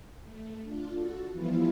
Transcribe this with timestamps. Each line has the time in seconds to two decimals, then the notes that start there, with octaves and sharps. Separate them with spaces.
0.23 A3
0.63 D4 F4
0.94 F#4 A4
1.32 E3 F3 G3 B3 E4 F4